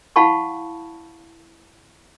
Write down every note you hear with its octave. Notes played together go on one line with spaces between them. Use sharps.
E4 F5 F#5 A5 B5 C#6